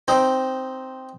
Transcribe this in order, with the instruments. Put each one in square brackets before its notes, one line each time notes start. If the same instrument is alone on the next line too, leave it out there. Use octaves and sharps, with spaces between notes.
[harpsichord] C4 D#4